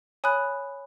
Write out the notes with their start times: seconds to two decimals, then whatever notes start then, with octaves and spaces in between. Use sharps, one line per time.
0.24 C#5 G#5 B5 D#6 F#6